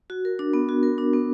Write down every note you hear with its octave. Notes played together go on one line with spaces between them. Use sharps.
F#4
A#4
D4
B3
F#4
A#4
D4
B3